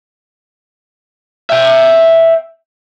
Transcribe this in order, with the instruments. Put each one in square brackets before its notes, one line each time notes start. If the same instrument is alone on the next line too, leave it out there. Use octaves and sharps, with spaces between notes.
[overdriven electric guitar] E5 G5